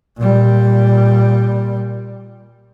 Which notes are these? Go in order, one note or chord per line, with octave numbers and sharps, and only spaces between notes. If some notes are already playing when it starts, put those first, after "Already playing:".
A#2 G3